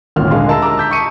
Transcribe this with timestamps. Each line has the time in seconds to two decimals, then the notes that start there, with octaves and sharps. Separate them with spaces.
0.16 G#1 D2 A#2 D#3 C#4 F6
0.31 D3 G#3 F5 C6
0.48 A#4 D#5 E5 A5 A#5 E6
0.62 G4 A#5 D6
0.77 A5 G6 B6
0.91 C#6 D#6 C#7 D#7